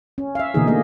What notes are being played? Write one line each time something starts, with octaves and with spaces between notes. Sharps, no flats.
C#4
E5 F5
B2 D3 E3 A#3 D#4 G#4
A3 A#3 G#4 D#5